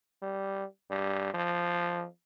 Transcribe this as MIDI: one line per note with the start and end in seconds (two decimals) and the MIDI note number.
0.22 0.64 55
0.90 1.31 43
1.34 2.05 53